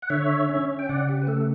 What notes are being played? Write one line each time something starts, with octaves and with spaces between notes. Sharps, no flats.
F#5
D3 C#5 E5
C#4
G5
C#3 D5 F#5
G4
B4
A3 A4